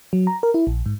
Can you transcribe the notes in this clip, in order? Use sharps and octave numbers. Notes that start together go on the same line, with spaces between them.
F#3
A#5
A#4
E4
A#1
G#2